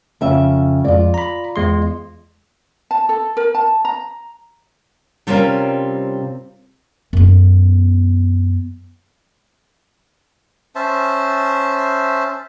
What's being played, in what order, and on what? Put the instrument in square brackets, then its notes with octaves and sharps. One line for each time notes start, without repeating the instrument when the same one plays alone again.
[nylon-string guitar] F2 C#3 E5
[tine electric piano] F2 G#3 [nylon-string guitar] F4 D5
[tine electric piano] A#5 B5
E2 G#3 C6
[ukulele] A5
A4
A#4
A5
A#5
[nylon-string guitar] C3 G3 C4 C#4 F4 A#4
[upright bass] F#2 B3
[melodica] C#4 C5 E5 A5